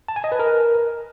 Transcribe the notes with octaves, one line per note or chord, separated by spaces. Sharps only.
A5
G#5
D#5
B4
A#4